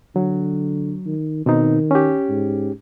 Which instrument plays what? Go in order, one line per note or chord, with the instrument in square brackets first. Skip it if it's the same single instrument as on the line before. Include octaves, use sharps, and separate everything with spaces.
[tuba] D3 [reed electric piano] F#3
[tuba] D#3
[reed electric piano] B2 C4 D#4 [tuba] D#3
[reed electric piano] C#4 G4
[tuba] G#2